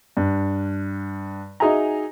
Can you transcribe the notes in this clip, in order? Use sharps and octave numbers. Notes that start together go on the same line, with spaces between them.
G2
D#4 F#4 G#4 E5 G#5 A#5